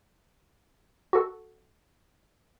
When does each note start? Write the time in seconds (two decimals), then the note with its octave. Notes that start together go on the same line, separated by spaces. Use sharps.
1.13 F#4 A4